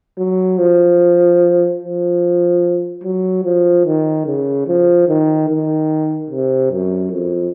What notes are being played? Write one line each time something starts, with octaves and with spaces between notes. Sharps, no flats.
F#3
F3
F3
F#3
F3
D#3
C#3
F3
D#3
D#3
C3
F#2
F2